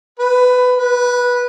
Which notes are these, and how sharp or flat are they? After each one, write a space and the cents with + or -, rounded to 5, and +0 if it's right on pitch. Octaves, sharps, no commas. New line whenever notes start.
B4 +15
B4 -15